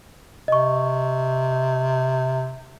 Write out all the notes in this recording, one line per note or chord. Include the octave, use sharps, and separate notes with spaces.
C3 D#5 C#6